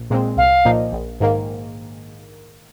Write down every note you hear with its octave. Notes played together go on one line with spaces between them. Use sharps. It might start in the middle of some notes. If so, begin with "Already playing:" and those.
Already playing: A#1
A#2 G#3 C4
C2 F5
A#2 F3 A#3 D#4
A#1
G#2 D#3 A#3